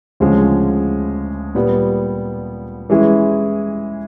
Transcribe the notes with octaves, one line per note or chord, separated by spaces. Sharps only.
D2 C#3 F3 G#3
A#2 G3 B3
E3 G#3 C#4 E4 G#4